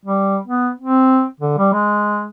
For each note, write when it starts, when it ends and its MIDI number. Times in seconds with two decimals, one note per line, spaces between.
0.05 0.38 55
0.47 0.70 59
0.80 1.25 60
1.40 1.55 50
1.58 1.70 55
1.73 2.29 56